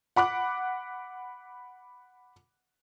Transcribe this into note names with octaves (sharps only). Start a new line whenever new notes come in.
F#5 B5 D6 F#6